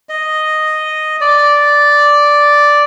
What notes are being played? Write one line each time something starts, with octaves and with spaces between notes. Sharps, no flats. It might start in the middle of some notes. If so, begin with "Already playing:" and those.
D#5
D5